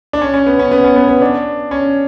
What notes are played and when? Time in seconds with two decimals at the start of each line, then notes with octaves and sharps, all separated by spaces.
0.13 D4
0.21 C#4
0.34 C#4
0.46 B3
0.59 C#4
0.71 B3
0.84 C#4
0.96 B3
1.09 B3
1.22 D4
1.71 C#4